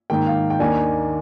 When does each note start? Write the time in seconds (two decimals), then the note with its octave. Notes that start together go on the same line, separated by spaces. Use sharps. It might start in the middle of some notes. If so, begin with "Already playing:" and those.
0.10 G#2 D#3 A#3 G5
0.27 F5
0.50 G5
0.59 D#2 D#3 A#3 D4 G#5